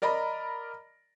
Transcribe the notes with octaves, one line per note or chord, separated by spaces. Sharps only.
A#4 D5 D#5 A#5 B5